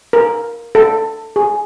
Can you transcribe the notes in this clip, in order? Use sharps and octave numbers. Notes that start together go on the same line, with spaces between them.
A#4
A4
G#4